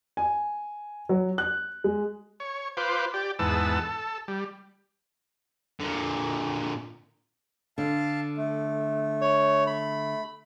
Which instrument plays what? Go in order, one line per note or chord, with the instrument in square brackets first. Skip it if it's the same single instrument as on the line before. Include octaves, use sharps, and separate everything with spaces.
[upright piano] G#5
F#3
F#6
G#3
[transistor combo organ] C#5
F4 B4 C5 D6
G4 D5
E2 G#2 B3 A5 E6
A4
G3
[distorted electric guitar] A#2 D3
[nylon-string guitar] D3 [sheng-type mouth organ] F5 A5
[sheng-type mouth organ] A3
[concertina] C#5
B5